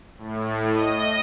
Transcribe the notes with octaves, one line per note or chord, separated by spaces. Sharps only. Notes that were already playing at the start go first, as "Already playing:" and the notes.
A2
D#5